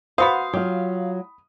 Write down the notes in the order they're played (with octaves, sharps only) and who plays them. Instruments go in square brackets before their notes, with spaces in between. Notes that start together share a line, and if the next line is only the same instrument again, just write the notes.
[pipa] B3 F#4 C5 [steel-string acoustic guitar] F5 [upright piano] B5 D#6
[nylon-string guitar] F#3 F4 [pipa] G4